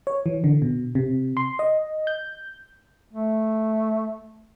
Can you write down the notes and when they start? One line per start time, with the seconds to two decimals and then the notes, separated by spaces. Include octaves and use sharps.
0.07 C#5
0.26 E3
0.44 D3
0.62 B2
0.95 C3
1.37 C6
1.59 D#5
2.07 G6
3.13 A3